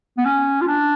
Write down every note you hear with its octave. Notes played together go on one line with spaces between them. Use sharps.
B3
C#4
F4
D4